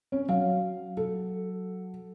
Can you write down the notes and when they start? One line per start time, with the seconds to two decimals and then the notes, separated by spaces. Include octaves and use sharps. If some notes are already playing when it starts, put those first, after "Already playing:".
0.12 C#4
0.29 F#3 F5
0.97 A4